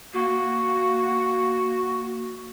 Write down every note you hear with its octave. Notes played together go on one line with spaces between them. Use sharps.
A#3 F#4